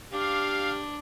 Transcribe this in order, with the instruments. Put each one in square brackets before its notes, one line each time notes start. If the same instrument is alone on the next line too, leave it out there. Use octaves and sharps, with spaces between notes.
[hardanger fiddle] D4 [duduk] G4 [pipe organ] F5